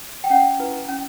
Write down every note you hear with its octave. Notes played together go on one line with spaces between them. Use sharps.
G5
C#4 F#5
E4 B4
C#4